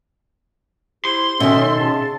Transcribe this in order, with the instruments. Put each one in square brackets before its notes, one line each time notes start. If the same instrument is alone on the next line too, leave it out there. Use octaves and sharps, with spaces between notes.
[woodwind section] E4 G4 C5 [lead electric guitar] C6
[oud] B2 D#3 [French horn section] C#4 [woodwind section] F#4 A4 E5
[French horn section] C#3 [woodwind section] A5